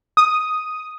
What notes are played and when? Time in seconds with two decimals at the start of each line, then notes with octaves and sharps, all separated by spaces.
0.17 D#6